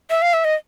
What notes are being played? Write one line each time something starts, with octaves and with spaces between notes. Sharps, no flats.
E5
F5
E5
D#5